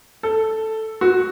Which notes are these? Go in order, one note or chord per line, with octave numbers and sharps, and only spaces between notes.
A4
F#4